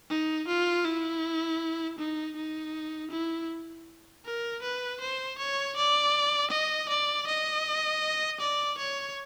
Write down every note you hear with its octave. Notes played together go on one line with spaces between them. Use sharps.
D#4
F4
E4
D#4
D#4
E4
A#4
B4
C5
C#5
D5
D#5
D5
D#5
D5
C#5